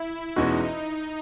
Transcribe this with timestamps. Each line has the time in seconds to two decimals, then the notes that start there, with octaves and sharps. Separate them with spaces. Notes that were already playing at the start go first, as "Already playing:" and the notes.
Already playing: E4
0.36 E2 B2 G#3 C#4 D#4 F#4